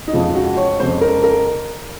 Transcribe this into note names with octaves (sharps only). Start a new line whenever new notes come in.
D#4
F2 C#3 G#3 F4
F4
F#4
C#5
F2 C#3 G#3 C5
A#4
A#4